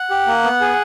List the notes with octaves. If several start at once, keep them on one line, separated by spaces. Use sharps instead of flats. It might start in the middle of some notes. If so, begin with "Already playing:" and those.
Already playing: F#5
G4
A#3
B3
G#4